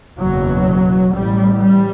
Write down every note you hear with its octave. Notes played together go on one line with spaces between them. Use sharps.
F#1 E2 B2 F#3
A1 A2 G3
G3